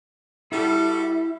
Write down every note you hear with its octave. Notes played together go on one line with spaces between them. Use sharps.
G3 E4 F#4 A4